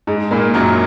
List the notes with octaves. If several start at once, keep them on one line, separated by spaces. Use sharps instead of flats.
G#2 G#3
A#2 A#3
F#2 F#3